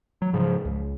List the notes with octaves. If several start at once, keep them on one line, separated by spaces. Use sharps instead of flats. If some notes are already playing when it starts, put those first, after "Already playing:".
F#3
G#2 C#3 F3
C#2